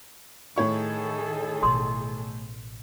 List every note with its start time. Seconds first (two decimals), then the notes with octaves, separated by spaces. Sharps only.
0.56 A2 D#3 G#4 A4 C#5 C#6
1.63 A1 B2 C6 D#6